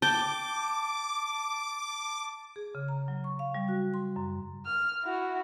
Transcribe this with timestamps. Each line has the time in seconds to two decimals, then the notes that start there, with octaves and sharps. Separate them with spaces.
0.02 G5 A5 D6
2.56 G#4
2.75 C#3
2.88 A#5
3.08 F#3
3.24 C#6
3.39 F5
3.54 G3
3.68 F#4
3.94 C6
4.16 F#2
4.66 F6
5.03 E4 F#4